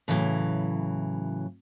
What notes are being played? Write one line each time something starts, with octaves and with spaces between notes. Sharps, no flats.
A2 C#3 E3 F#3